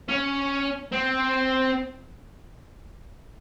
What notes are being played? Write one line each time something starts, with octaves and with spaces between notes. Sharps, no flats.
C#4
C4